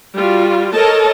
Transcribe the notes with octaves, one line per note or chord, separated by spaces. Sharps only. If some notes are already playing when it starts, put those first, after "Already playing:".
G3 F4 F#4
A4 A#4 C#5 D#5 A5